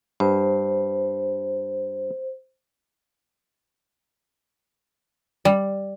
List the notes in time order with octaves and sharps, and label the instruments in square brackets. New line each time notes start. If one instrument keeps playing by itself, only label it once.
[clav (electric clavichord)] G2 [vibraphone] C5
[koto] G3